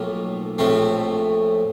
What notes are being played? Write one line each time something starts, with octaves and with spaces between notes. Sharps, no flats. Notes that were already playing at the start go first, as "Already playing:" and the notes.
Already playing: B1 A2 F3 A#3
A#1 A2 F3 A3 C4